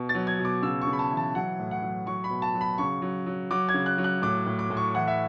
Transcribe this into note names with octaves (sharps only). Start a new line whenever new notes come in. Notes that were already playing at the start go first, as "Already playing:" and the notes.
Already playing: B2
A6
F#3
G#6
B2
D6
C#3 E6
C#6
C#3
B5
A5
E3
A5
F#3 F#5
A2
F#5
F#3
F#3 C#6
B5
B2
A5
F#3
B5
C#3 C#6
F#3
F#3
F#3 D6
G#6
C#3
F#6
F#3
F#6
A2 D6
A2
D6
A2
C#6
E3 F#5
E5